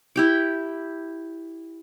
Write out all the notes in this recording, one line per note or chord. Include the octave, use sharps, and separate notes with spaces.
E4 G4 G5